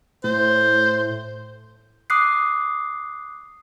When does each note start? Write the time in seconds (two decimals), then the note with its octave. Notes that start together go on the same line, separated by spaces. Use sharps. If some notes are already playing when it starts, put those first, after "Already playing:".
0.24 A2 C5
2.10 D6 D#6 F#6 C7